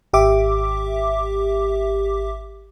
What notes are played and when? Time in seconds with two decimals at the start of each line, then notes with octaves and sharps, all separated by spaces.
0.13 G#1 G4 E5 D6